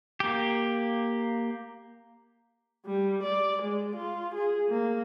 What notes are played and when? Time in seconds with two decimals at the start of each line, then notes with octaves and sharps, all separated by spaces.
0.20 A#3 G4
2.86 G3
3.23 D5
3.62 G#3
3.95 F4
4.34 G#4
4.69 A#3